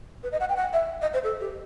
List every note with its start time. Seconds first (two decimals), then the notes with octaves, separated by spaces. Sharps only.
0.23 B4
0.32 D#5
0.40 F#5
0.49 G5
0.56 F#5
0.73 E5
1.02 D#5
1.14 C5
1.24 A4
1.41 G4